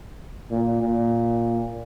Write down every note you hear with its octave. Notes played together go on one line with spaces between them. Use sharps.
A#2
A#2